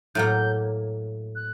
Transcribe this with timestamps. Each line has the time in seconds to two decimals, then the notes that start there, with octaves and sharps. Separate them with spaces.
0.15 A2 F#3 A#3 G6
1.35 F#6